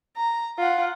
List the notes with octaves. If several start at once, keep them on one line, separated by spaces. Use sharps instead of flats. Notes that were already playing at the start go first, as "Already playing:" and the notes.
A#5
F4 F#5